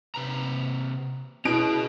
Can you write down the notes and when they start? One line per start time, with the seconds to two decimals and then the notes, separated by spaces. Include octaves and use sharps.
0.15 C3 B4 A#5
1.45 B2 C#4 E4 G#4 D7